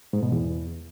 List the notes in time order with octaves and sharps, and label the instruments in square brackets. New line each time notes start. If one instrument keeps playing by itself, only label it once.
[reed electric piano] G#2
B2
E2